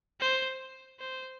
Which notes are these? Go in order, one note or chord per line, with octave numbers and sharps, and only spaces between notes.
C5
C5